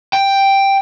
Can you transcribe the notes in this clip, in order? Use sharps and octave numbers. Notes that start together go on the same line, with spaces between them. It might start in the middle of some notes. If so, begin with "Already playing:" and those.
G5